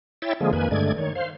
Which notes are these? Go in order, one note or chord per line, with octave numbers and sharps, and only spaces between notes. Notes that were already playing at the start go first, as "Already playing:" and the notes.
E4 C#5 E5 G5 A6
D3 F3 G#3 A#3 G#4
F2 D#3 A#3 B4 G#5
G2 D3 G#3 A3 D5 G#6
D#3 C#5
C5 F5